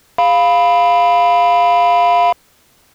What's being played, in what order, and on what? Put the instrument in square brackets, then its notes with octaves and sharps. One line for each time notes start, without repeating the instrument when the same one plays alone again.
[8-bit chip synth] F5 B5